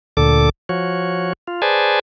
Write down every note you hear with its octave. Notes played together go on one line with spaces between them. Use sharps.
D2 A#2 D3 A4 D6
F3 F#4 C#5
F4
G#4 B4 C5 D5 G#5 A5